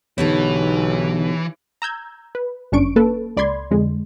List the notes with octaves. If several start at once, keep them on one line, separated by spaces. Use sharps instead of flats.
B1 B2 D3 E3 B3 D#4 G4 C#5
A#5 E6 G6 G#6
B4
G1 F#2 C#4 D4 C#6 D7
A#3 A4 B4 A5
C#2 D5 B5 C6 G#6
F2 D3 G#3